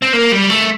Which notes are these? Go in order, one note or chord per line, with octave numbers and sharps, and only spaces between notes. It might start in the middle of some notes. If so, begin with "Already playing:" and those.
C4
A#3
G3
A3